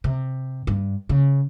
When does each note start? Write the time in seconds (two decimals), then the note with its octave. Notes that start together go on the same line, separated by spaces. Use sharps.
0.04 C3
0.67 G2
1.09 C#3